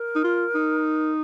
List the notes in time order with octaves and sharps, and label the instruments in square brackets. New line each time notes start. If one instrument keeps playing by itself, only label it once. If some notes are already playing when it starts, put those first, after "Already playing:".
Already playing: [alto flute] A#4
[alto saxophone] D#4
F4
D#4